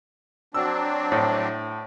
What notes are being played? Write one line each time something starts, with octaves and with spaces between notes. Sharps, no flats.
F#3 C4 D4 E6
A2